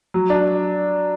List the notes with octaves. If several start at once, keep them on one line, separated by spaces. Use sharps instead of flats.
F#3
D4